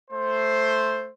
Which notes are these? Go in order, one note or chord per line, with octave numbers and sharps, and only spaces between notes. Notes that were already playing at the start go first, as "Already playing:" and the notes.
A3 C5